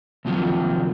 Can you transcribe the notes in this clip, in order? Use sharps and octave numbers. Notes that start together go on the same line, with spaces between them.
D#2 C3 F3 F#3